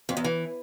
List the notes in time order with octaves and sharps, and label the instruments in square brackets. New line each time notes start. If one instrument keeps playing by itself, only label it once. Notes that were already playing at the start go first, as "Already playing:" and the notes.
[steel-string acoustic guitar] F2
E2
E3